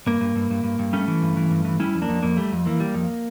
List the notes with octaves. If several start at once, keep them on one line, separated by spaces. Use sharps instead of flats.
G2 A#3
G2
G2
G2
G2
G2
G3 A3 C#4
E3
G2
E3
G2
E3
G3 C#4 E4
F2
A#3 D4
F2
F2 A#3
G3 A3
F2
E3 A#3
G3
F2